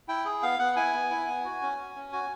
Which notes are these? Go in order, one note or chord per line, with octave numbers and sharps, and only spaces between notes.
E4 G5
G#4
B3 F5
B3 F#5
E4 G#5
B3
E4
B3
F#4
C#4
C#4
C#4
F#4 G#5